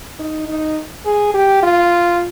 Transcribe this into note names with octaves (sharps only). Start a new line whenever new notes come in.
D#4
D#4
G#4
G4
F4